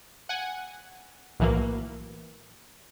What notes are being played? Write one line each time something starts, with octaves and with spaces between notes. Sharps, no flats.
F#5 G#5
B1 A2 E3 F#3 A#3